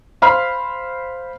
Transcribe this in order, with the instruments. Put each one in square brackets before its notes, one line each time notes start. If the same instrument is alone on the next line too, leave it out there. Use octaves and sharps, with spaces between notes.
[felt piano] C5 F5 B5 C6 F6